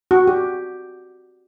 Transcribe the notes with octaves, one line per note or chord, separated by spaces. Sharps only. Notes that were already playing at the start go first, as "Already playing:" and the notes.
F#4
G4